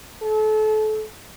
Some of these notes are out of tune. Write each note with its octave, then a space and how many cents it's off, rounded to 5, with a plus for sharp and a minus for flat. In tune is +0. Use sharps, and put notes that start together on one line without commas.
A4 -30